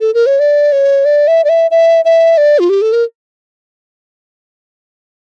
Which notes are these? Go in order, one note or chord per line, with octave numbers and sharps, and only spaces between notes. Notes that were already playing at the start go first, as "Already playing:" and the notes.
A4
A#4
C#5
D5
C#5
D5
E5
D5
E5
E5
E5
D5
F4
G4
A4
A#4